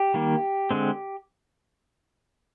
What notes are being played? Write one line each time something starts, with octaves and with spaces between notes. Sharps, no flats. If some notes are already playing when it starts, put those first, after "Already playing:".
Already playing: G4
D#3 G3 A#3
D3 G#3 C4